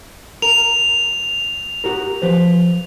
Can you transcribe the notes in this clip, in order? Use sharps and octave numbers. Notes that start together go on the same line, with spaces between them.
A#4 F7
F#4 G4 A#4
F3 B4 C5